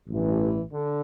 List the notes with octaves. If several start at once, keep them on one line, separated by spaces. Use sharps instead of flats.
A1 G2 E3
D3